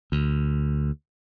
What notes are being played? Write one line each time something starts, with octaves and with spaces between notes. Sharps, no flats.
D2